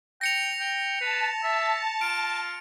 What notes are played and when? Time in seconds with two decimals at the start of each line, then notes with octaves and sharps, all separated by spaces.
0.21 G5 A#6 C#7 F7
0.60 G5
1.01 B4 A5
1.43 E5
2.01 F4 D7